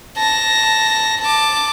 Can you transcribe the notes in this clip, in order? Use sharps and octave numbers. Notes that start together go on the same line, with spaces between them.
A5 A#6
A5 D6